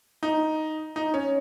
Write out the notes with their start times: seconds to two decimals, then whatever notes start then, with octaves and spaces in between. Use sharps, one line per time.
0.23 D#4
0.96 D#4
1.14 C#4